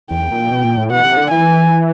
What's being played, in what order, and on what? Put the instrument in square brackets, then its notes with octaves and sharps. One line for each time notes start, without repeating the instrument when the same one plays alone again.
[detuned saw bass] E2 [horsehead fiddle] G5
[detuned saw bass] A#2
B2
A#2
A2
[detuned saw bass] B2 [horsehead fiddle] F#5
[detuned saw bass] C3
D3
[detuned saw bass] E3 [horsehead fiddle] G#5